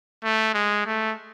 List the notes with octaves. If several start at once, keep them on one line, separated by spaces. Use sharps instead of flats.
A3
G#3
A3